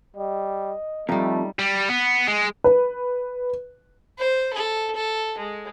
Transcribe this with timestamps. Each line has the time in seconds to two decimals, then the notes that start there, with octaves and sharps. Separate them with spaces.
0.17 G3 D#5
1.09 F2 G3 A3 D#4
1.59 G3
1.89 B3
2.28 G#3
2.64 B4
4.18 C5
4.53 A4
4.95 A4
5.38 G#3